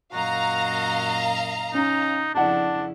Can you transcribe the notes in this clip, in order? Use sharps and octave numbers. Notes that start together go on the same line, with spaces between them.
F#2 A#2 F#4 D#5 F5 A#5
C#4 D#4
F2 C#3 D4 E4 D5 F#5 A5